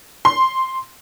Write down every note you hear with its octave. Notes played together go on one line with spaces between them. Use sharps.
C6